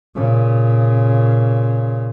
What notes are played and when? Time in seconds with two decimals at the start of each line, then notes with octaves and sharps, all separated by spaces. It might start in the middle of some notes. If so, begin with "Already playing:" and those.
0.15 A#2 C#3